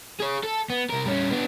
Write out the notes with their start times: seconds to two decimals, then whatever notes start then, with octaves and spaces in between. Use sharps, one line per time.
0.20 G#4 C#5
0.44 A4
0.70 B3
0.89 C2 A#4
1.06 G3 C#4
1.31 B3 D4